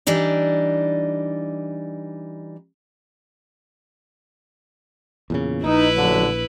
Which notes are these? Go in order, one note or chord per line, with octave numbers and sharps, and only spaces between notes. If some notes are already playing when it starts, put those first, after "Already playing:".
E3 G3 D4 D#4
E2 A#2 C#3
A#1 D#4 E4 B4
A1 D3 F#3